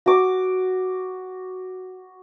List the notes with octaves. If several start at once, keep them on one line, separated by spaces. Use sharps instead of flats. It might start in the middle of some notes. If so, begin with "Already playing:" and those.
F#4 D6